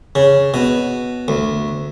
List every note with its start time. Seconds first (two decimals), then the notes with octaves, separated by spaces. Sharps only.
0.15 C#3
0.54 B2
1.28 D2